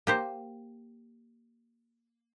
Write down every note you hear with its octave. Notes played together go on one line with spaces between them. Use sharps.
A#3 G4 C5